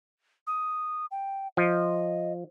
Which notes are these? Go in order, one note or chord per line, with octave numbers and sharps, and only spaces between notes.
D#6
G5
F3 D#5